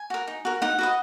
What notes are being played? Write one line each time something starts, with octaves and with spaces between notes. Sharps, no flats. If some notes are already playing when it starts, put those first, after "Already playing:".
Already playing: G#5
F#4 A#4
D#4
F#4 A#4
D#4 F#5
F#4 B4 D#5